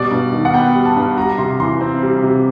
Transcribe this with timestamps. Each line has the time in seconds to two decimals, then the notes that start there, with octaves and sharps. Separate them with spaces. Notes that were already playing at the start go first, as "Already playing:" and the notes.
Already playing: B2 G3 D5
0.11 G2
0.32 D#3
0.45 F#5
0.54 B3 G5
0.75 G3
0.85 A5
0.96 G2
1.18 G3 A#5
1.38 C3 C6
1.60 E3 C6
1.81 C4
2.02 G3
2.23 C3